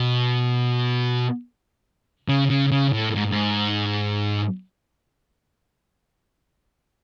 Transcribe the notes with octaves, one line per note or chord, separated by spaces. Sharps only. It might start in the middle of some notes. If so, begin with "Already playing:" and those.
Already playing: B2
C#3
C#3
C#3
A2
G#2
G#2